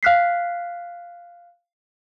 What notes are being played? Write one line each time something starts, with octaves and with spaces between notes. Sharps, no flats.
F5 F6 F#6 B6 C7